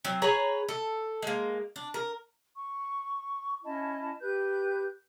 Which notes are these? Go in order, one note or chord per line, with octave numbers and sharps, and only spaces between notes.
F#3 C4
G#4 B4 C#5 A#5
A4
G#3 A#3
D4
A#4
C#6
C#4 E4 D#5 A5
G4 B4 G6